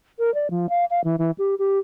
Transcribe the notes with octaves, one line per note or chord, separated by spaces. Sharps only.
A#4
D5
F3
F5
F5
E3
E3
G4
G4